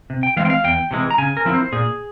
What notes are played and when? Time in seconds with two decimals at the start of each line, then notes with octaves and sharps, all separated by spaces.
0.10 C3
0.23 G5
0.36 E3 G#3 C4 F5
0.45 G5
0.50 F5
0.64 E2 G5
0.91 C3 E3 G#3
1.11 A#5
1.18 C#3 G#5
1.37 A#4
1.45 F3 C4 E4
1.54 C5
1.72 A#2 G#4